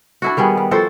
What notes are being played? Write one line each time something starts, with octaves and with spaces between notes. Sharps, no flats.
D4 E4 F#4
D#3 G3 B3 G#4
G3
F3 F#4 A4 C5